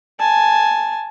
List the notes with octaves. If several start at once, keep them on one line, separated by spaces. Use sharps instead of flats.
G#5 A5